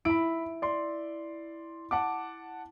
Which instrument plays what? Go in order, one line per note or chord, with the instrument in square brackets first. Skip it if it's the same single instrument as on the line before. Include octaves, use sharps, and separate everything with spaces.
[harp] E4 [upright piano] B5 D7
[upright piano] D5 C6
F#5 A5 D6